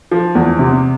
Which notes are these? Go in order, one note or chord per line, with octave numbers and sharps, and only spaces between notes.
F3
E2
C3